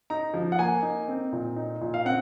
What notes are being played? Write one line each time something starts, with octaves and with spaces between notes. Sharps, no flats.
D#4 A#5
F3
F#5
A#3 G#5
D#4
C4
A#2
D#4
A#2
F5
C4 F#5